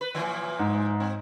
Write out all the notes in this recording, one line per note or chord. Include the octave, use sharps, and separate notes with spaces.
B4
A#2 E3 F3
G#2
C4